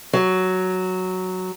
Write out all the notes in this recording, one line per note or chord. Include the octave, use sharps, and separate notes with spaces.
F#3